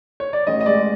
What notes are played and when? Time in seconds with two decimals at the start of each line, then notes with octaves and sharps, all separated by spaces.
0.20 C#5
0.33 D5
0.47 A1 D#5
0.61 D#5
0.66 G#3 D5